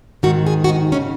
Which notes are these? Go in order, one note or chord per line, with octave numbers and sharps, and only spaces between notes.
G#2 D#3 F#4
G#4
F#4
D#4
C#3 C#4